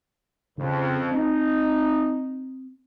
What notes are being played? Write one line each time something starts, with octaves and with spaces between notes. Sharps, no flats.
F2 C#3
C4 D#4